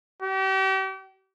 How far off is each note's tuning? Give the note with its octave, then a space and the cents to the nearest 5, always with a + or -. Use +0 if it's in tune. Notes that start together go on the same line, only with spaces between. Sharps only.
G4 -40